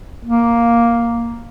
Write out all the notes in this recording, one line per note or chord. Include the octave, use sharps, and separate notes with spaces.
A#3